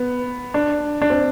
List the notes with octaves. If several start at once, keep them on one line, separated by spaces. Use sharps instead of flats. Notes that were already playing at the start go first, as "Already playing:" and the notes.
Already playing: B3
D4
D4
C4